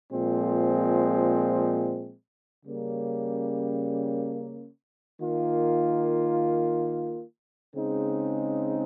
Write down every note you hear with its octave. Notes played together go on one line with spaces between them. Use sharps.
A#2 F3 G#3 C4
C#3 G3 A#3 C#4
D#3 A#3 F4
C#3 G#3 C4 D#4